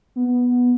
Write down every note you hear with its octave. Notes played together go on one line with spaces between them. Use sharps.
B3